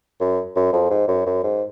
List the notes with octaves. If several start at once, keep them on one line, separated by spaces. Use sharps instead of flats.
F#2
F#2
F2
G#2
F#2
F#2
G#2